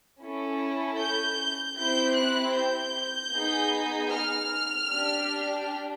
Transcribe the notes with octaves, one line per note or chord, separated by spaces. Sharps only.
C#4 E4 A4
G6
C4 E4 G4 G6
F#6
G6
B3 D#4 G#4
F6
D4 G4